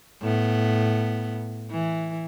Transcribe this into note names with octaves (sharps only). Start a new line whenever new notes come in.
A2 B3
E3